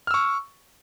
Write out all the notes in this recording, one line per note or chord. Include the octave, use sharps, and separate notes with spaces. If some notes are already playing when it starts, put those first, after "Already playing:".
C#6 E6 F6